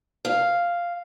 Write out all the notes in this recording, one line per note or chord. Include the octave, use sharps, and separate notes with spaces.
F5